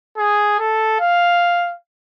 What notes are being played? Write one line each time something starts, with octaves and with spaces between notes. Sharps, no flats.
G#4
A4
F5